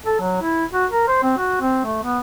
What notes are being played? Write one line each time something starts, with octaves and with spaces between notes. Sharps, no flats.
A4
F#3
E4
F#4
A#4
C5
C4
F#4
C4
A3
B3